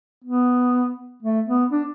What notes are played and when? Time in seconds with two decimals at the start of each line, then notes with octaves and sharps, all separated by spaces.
0.24 B3
1.22 A3
1.47 B3
1.71 D4